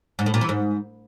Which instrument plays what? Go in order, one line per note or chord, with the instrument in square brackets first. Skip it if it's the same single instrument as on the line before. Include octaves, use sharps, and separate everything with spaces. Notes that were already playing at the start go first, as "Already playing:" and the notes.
[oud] G#2
A2
A#2
E3
G#2